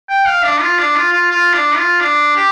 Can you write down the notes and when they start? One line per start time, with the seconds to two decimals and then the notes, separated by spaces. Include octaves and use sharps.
0.09 G5
0.26 F5
0.44 D4
0.61 F4
0.79 D4
0.96 F4
1.13 F4
1.31 F4
1.54 D4
1.77 F4
2.00 D4
2.36 G4